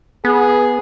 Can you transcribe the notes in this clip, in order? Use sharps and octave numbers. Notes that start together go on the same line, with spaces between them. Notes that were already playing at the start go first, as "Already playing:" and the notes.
B3 G#4